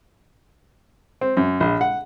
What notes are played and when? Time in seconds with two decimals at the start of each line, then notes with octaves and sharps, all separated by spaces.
1.21 C4
1.37 F#2
1.60 A#1
1.81 F#5